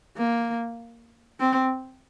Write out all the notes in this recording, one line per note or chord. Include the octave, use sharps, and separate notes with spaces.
A#3
C4